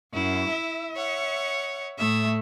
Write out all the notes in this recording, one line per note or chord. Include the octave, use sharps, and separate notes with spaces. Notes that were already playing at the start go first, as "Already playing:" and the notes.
F#2 E4
E5
C#5 F#5
A2 A3 E5 D#6